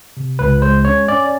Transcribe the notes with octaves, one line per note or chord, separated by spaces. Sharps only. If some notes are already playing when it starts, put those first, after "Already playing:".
C3
C#2 B4
G#3 C5
C#4 C#5
C#4 D5